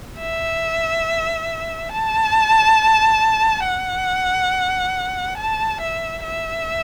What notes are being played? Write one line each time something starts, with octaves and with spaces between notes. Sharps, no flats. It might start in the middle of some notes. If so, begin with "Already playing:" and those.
E5
A5
F#5
A5
E5
E5